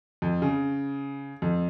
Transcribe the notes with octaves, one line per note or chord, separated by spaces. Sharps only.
F2
C#3
F2